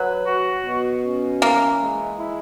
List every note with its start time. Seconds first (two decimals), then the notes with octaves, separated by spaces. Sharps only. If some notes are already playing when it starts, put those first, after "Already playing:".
Already playing: F#3 B4
0.26 F#4
0.65 B2
1.04 C#4
1.42 E3 A#3
1.81 G#3
2.20 E4